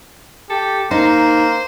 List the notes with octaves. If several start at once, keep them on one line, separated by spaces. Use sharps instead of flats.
G4 A4
A#3 D#4 C5